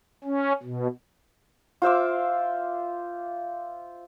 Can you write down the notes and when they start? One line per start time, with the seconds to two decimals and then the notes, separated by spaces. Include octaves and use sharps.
0.24 C#4
0.63 B2
1.82 F4 C5 E5 D6